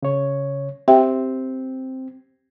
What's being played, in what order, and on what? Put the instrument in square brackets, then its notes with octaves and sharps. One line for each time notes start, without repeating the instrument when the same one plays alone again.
[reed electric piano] C#3 C#5
[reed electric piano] C4 [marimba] G4 E5 G5